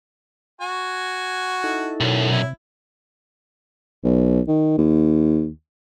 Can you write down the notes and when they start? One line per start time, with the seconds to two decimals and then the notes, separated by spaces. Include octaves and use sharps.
0.61 F#4 G#5
1.64 D#4 E4 A4
2.01 B1 F#2 B2
2.31 C3 E4
4.04 B1
4.48 D#3
4.78 D#2